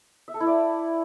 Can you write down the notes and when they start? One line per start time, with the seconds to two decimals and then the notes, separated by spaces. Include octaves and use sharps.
0.28 E5
0.34 A4
0.40 E4
0.47 D5